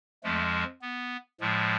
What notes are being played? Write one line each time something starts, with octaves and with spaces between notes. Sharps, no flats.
F2 F3 G#3 A3
B3
A2 F3 G#3